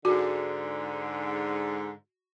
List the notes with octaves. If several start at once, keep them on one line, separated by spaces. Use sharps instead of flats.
G#2 D3 F#4